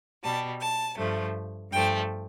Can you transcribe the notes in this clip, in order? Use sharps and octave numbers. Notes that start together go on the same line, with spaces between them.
B2 G3 A5
A5
G2 F3 A3
G2 F3 A3 G5